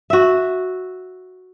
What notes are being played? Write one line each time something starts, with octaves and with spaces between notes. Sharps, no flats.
F#4 E5